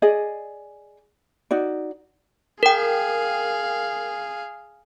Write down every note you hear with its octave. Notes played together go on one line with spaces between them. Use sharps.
G#4 D5 D#5
D#4 F#4 D5
G#4 A#4 F5 G5